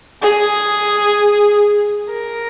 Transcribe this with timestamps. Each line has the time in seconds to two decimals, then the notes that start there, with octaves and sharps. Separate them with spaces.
0.22 G#4
2.11 A#4